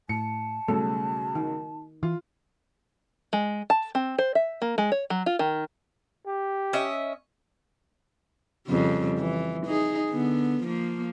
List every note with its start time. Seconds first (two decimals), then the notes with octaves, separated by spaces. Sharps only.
0.09 A2 A5 C#7
0.68 B1 C#3 G3 A3 A4
1.35 D#3
2.03 E3 F4
3.33 G#3
3.70 A5
3.95 C4
4.18 C5
4.35 E5
4.62 A#3
4.78 G#3
4.92 C#5
5.10 F#3
5.26 F4
5.39 D#3
6.27 G4
6.73 C#4 D#5 E5
8.67 F2 C#3 G3
9.18 E3
9.67 D#4 G#4
10.11 D3 B3
10.63 F3 A#3